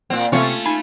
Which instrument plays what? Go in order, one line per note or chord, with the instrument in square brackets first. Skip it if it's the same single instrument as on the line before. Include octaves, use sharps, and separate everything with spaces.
[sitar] A#2 C4 [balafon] A#3
[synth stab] C3 C4 C#6 [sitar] A3 C#4 F4
[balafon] D#4 [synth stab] G#5